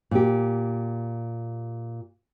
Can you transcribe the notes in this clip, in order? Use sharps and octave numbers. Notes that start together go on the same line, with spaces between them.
A#2 G4